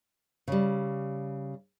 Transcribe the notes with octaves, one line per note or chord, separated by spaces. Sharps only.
C#3 G3